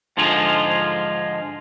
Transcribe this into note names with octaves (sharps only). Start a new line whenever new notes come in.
G#2 D3 F3 G#3 F4